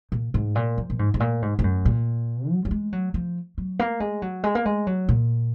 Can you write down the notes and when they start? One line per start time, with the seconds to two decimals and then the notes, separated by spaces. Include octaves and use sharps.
0.12 A#2
0.34 G#2
0.55 A#2
0.78 F3
0.90 A#2
0.99 G#2
1.14 G#2
1.20 A#2
1.42 G#2
1.59 G#2
1.64 F#2
1.85 A#2
2.50 F#3
2.65 F#3
2.71 G#3
2.92 F#3
3.14 F3
3.58 F#3
3.79 A#3
4.00 G#3
4.22 F#3
4.43 G#3
4.55 A#3
4.65 G#3
4.87 F#3
5.09 A#2